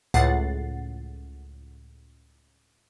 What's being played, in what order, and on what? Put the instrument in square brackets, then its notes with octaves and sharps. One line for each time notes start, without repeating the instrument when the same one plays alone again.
[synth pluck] C#2 A2 F#5 A6 C7